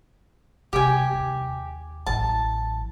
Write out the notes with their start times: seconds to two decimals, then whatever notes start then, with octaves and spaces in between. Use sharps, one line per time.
0.73 C3 G4 G#5
1.13 D#2
2.07 A1 F#3 A5